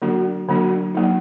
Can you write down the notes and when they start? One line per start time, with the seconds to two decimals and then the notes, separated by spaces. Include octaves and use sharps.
0.02 D3 F#3 A#3 D4 F#4
0.48 D3 F#3 A#3 D4 F#4
0.94 F#3 A#3 D#4